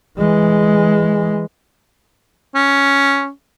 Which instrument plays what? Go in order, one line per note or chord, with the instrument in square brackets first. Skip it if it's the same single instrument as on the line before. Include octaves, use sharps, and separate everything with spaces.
[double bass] E3 G#3
[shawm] C#4